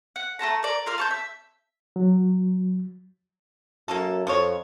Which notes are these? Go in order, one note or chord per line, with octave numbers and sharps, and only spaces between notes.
F#5
A3 F4 A5 A#5
A#4 D5
F4 A#4 F5 F6
A5 C#6 G6
E5
F#3
F#2 A#3 C#4 A4
F2 F3 F4 C#5